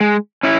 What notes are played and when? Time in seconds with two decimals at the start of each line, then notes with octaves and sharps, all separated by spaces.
0.01 G#3
0.43 C#4 E4